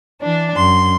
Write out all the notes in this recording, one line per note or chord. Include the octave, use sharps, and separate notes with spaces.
E3 D4
F#2 C6